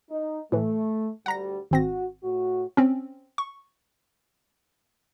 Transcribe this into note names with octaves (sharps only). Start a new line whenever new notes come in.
D#4
A2 E3 A3
D2 G3 F#5 A#5 A#6
G#1 C4 F#4 A#6
A2 F#4
C4 C#4
C#6